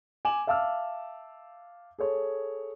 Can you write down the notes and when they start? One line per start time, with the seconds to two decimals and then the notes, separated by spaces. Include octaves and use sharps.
0.25 G#5 D6 E7 F#7
0.47 E5 F5 A5 D6 E6 F6
1.99 G#4 A4 C#5